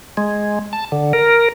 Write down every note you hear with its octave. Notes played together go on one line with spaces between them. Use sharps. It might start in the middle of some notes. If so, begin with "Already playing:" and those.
G#3
A5
D3
A#4